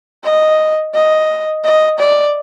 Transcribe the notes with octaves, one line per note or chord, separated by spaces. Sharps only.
D#5
D#5
D#5
D5